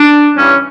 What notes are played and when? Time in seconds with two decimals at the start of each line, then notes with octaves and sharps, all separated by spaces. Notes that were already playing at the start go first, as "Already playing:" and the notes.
Already playing: D4
0.37 G2 E3 C#4